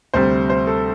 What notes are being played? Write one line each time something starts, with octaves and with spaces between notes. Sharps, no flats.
D2 C3 G3 C5
C5
A4